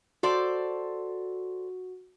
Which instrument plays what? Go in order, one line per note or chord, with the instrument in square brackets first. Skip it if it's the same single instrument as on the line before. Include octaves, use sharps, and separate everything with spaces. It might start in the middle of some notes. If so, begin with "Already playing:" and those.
[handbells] F#4 [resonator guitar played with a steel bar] A4 C5 D5